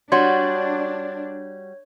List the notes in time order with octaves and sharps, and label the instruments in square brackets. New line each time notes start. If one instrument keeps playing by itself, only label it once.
[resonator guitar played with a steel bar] G3 F#4 [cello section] D4 [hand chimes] C#5 G#6 [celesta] C6